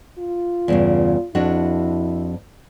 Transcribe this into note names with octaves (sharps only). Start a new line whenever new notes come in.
F4
E2 G2 C#3
F2 D4 E4 F#4